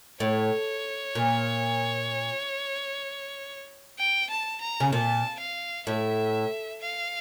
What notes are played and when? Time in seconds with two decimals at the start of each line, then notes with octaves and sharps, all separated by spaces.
0.20 A2 C#5
1.15 A#2
3.98 G5
4.30 A5
4.61 A#5
4.80 C#3
4.92 A#2 A5
5.40 F5
5.87 A2 E5
6.81 F5